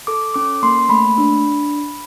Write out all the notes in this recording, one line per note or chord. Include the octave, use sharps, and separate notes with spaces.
A4 D6
C#4 D6
A#3 C6
A3 B5
D4